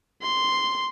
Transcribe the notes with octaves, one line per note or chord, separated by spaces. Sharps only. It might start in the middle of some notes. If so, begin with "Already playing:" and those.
C6